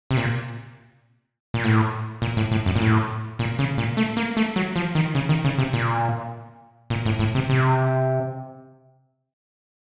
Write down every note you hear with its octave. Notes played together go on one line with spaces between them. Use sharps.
C3
A#2
A#2
A2
A#2
A2
A2
F#2
A#2
A2
A#2
C#3
A#2
A3
A#3
A3
F#3
F3
D#3
C#3
D#3
C#3
C3
A#2
A#2
A2
A2
C3
C3